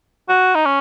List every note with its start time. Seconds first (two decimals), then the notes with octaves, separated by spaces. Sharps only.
0.29 F#4
0.55 D#4
0.66 C#4